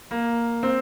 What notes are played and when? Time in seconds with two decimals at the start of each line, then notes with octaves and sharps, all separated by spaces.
0.11 A#3
0.63 C4